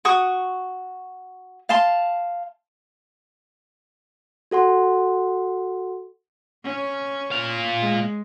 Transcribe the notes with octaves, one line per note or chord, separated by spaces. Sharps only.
F#4 C#6 D#6
F5 A5 C6
F#4 A4 F#5 C6
C#4
A#2 F5
G#3